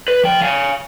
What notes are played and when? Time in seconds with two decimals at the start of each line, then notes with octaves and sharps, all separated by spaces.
0.08 B4
0.24 F3 G5
0.42 F5 G#5